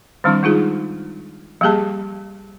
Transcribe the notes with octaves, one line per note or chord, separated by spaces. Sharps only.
D#3 F3 G3 C4 D4 E4
G#3 D#4 F4 G#4
F3 G3 A#3 G4 G#4 A5